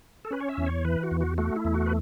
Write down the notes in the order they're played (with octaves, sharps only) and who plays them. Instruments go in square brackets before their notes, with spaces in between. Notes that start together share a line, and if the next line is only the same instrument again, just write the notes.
[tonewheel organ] A4
C#4 B4
C#5
E5
E2
C#5
E3 B4
F#4
E2
F#4
A3 F#4
E4
E2
F#4
B4